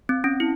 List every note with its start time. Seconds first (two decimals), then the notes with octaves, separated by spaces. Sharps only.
0.09 C4
0.24 C#4
0.40 E4